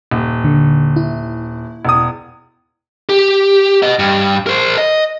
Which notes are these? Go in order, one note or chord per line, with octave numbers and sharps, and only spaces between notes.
D#1
D3
E4
E1 D#6
G4
B4 D#5
G2
A#4 C5
D#5